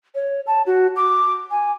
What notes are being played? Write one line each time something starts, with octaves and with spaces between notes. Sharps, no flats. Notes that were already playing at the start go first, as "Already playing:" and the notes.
C#5
A5
F#4
D6
G#5